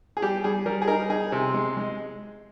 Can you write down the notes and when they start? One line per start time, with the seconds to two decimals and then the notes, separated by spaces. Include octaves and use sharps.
0.17 G#4
0.22 G3 G4
0.44 G3 G#4
0.66 G3 A#4
0.82 G#4
0.88 D#4 A#4
1.10 D#4 G#4
1.32 C3
1.54 G#3
1.77 G#3